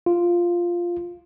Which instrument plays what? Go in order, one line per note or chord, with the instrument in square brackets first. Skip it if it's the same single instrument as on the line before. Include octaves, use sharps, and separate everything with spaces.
[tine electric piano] F4